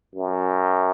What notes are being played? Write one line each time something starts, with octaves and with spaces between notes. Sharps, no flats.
F#2